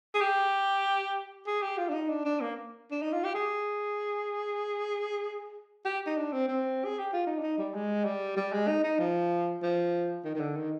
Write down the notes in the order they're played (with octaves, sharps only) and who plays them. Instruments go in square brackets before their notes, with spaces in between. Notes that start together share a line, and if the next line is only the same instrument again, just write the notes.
[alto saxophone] G#4
G4
G#4
G4
F4
D4
D#4
D4
D4
A#3
D4
D#4
F4
G4
G#4
G4
D#4
D4
C4
C4
G#4
G4
F4
D#4
D4
D#4
G3
G#3
G3
G3
G#3
D#4
D#4
F3
F3
D#3
D#3
D3
D#3